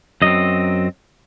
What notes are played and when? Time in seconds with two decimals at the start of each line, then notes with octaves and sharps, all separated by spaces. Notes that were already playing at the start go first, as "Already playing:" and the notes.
0.22 F#2 F#3 C4 D#5